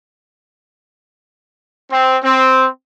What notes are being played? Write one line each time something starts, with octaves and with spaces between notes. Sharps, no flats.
C4
C4